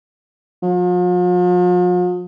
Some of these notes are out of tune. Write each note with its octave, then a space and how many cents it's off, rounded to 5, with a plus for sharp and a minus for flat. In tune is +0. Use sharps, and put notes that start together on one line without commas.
F3 +45